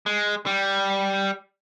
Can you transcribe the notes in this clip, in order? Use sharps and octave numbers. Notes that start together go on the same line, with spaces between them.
G#3
G3